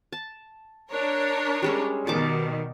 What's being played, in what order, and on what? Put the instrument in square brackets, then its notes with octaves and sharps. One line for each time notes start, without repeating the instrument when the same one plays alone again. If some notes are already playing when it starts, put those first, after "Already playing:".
[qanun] A5
[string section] D4 A#4 C#5
[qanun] G3 G#3 C#4
[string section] B2 D#3 [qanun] D5 A5 D6